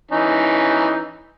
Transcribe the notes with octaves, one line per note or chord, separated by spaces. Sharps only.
E3 C#4 D#4